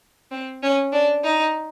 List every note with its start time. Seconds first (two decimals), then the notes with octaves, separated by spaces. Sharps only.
0.31 C4
0.63 C#4
0.92 D4
1.24 D#4